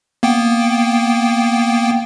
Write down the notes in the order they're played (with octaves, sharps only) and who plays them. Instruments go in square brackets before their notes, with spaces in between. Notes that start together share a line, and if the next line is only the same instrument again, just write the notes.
[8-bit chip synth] A#3 B3 G5